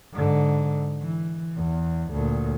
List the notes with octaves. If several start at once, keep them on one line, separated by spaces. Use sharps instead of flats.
G#2 D3
E3
E2
D2 A#2